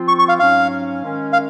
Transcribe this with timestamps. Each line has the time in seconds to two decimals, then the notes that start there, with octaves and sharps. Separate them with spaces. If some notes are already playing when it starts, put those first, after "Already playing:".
Already playing: F3 C4 F4
0.08 C#6
0.19 C#6
0.29 F5
0.39 G#2 F#3 C#4 F5
1.02 D#3 G#3 C#4
1.33 F5